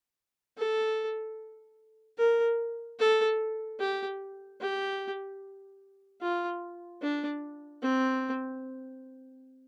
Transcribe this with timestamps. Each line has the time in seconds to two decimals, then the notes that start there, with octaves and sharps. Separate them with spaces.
0.58 A4
2.18 A#4
2.99 A4
3.80 G4
4.61 G4
6.22 F4
7.02 D4
7.82 C4